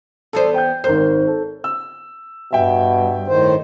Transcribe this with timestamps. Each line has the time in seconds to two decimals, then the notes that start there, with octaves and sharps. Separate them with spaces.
0.33 E2 B3 A4 C5 D5
0.54 G5 G6
0.84 G#1 A#4 C5 G6
1.27 A4
1.64 E6
2.53 G2 B2 E5 G5
3.28 A2 D#3 C5